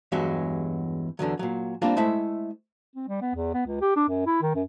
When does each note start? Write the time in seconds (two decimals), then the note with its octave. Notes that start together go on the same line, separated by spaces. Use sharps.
0.12 E2 G2 F#3 G#3 F#4 G4
1.19 E2 D3 D#3 F#3
1.39 A#2 F#3
1.82 G3 A#3 C4 D4 F4
1.97 G#3 A3 E4 C5 E5
2.95 C4
3.08 G3
3.22 B3
3.35 E2
3.54 B3
3.66 C#2
3.81 G4
3.96 D4
4.09 F#2
4.27 E4
4.42 D#3
4.55 F#2